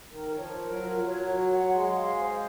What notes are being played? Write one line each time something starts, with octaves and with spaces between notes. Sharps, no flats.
D#3 A#4
F3 C#5
A#4
F#3
F4
F#3 C#5
F#4
F#5
G#3 C6
F5
C5